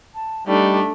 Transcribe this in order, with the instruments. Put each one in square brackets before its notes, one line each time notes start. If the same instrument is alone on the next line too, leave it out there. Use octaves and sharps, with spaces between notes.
[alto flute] A5
[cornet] G3 [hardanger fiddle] A3 D4 [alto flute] D#4